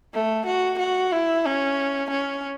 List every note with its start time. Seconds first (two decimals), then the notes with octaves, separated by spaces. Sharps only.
0.14 A3
0.46 F#4
0.79 F#4
1.12 E4
1.46 C#4
2.10 C#4